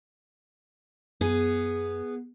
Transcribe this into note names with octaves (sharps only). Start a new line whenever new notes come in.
F#2 B3 G#4